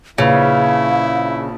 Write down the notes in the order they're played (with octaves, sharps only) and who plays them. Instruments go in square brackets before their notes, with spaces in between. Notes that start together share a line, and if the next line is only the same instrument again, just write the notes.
[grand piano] A#1 B4 F7 [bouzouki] C#3 [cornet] E4 [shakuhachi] F5